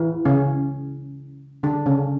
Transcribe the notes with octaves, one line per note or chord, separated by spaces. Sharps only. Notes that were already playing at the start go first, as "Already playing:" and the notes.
Already playing: E3
C#3 C#4
D3 D4
C#3 C#4